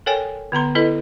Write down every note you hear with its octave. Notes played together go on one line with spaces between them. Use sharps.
A4 A#4 C#5 G5 G#5
D3 B3 A#5 C6
E4 A4 B4 D#5